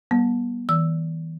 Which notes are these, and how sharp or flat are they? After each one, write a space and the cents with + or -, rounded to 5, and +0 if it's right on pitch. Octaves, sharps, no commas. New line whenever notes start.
G3 -25 B3 -40
E3 -30 E6 +0